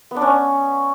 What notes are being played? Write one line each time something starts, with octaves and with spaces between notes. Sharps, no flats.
B3
D4
C#4